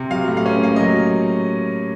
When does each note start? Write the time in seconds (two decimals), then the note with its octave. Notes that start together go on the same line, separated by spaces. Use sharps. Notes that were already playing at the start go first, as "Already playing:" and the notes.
Already playing: C3
0.10 F#3 F5
0.28 A2
0.37 F5
0.46 C#4
0.63 A#3 F5
0.76 F#3 D#5